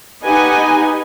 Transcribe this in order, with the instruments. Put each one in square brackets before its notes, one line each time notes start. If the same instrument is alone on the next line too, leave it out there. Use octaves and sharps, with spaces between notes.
[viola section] D#4 G4 B4 D#5 F#5 G#5